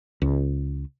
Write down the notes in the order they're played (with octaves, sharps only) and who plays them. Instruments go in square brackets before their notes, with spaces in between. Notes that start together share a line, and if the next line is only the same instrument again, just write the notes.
[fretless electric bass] C#2